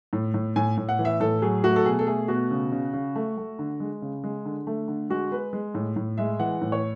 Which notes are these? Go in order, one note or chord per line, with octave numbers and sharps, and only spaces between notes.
A2
A2
A2 G#5
A2
F#5
E3
E5
A2 A4
F#3 G#4
A3 F#4
A4
B2 G#4
A4
A3 G#4
B2 F#4
C#3
C#3
C#3
A3
A3
D3
G#3
C#3
G#3
D3
A3
D3
G#3 F#4
G#3 B4
G#3
A2
A2
G#3 E5
E3 F#5
A2
C#5